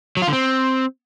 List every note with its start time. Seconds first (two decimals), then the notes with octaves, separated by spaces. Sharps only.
0.17 F#3
0.22 F4
0.27 D3
0.33 C4